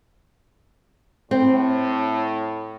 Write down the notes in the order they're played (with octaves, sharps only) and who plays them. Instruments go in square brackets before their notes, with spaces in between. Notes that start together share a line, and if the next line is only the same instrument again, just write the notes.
[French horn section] A2 [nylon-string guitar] C4